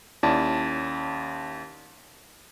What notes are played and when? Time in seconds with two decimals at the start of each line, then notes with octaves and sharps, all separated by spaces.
0.23 D#2 C#4 E4 D5 A5